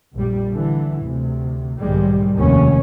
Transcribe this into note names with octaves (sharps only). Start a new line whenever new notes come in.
A#1 F2 G3
D3 E3
D2 C3
B1 G#2 D#3 G3 G#3
F1 D#2 C3 C#4